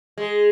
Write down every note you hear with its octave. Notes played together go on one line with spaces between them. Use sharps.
G#3